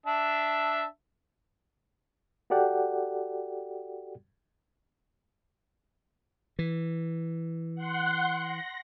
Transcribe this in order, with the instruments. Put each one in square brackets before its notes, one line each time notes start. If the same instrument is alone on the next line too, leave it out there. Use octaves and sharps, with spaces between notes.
[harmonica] D4 E5 A5
[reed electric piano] F#4 G4 A4 D5 F#5 G5
[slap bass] E3
[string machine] F#5 C6 F#6
A#6